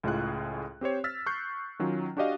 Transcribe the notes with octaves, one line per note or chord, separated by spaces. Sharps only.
C#2 A2 G#3 F4 G#4 F#6
C4 G4 C5 C#5
E6 F6 A6 B6
C#6 F#6 G6 C7
D#3 F#3 C#4 F4
D4 F#4 G4 D5 D#5 F5